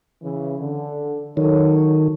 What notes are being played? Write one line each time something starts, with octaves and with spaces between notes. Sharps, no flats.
C#3 E3
D3
D#3 F#3 A4 C#5